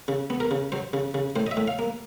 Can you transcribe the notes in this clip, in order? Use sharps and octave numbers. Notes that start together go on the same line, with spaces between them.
C#3
B3
A#4
C#3
F#3 C5
C#3
C#3
A2 C5
D#5
E5
A2
F5
A#3